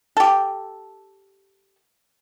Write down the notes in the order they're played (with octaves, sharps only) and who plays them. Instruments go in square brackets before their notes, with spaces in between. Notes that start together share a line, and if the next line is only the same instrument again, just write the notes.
[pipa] G4 A4